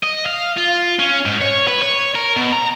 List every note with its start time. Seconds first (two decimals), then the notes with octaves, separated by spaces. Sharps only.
0.04 D#5
0.26 F5
0.57 F4
0.99 C#4
1.26 G#2
1.41 C#5
1.67 B4
1.82 C#5
2.15 A#4
2.37 B2
2.53 A#5